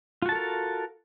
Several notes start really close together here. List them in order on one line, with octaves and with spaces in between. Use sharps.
F4 F#4 A5 A4 A#4